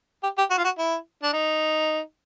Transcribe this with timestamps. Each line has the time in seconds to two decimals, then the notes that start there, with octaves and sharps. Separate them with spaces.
0.23 G4
0.38 G4
0.51 F#4
0.58 F4
0.64 F#4
0.78 E4
1.23 D4
1.33 D#4